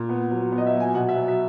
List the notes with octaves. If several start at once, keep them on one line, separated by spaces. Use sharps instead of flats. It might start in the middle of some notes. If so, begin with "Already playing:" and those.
Already playing: A#2
B3
F#3
B3
D#5
E5
F#3
G#5
B2 F#5
E5
F#3
E5